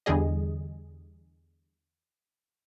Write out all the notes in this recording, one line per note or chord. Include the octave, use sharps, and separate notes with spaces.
E2 D3 G3 G#4 D#5